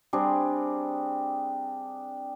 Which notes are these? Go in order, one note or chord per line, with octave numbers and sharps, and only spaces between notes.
G3 C4 D4 G#4